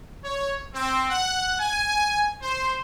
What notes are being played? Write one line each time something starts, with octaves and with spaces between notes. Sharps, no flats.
C#5
C4
F#5
G#5
C5